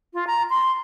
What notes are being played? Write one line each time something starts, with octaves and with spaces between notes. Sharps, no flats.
F4
A#5
C6